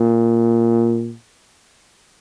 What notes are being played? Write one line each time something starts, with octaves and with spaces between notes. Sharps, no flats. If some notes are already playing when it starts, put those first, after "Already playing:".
Already playing: A#2